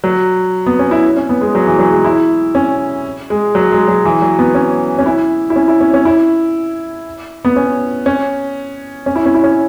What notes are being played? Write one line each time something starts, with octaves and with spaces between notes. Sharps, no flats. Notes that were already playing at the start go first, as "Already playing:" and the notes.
F#3
B3
C#4
E4
C#4
B3
G#3
F#3
E3
F#3
G#3
E4
C#4
G#3
F#3
G#3
F#3
E3
F#3
B3
C#4
C#4
E4
E4
C#4
E4
C#4
C#4
E4
B3
C#4
C#4
C#4
E4
C#4
E4
C#4